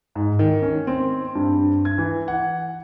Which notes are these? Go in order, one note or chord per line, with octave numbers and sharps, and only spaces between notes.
G#2
D#3
C#4
C4
G2
G#6
E3
F#5